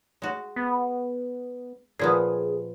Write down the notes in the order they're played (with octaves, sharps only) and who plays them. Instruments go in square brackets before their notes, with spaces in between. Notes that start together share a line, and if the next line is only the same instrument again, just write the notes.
[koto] G#3 F#4
[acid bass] B3
[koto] A#2 F3 B3 [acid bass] G#4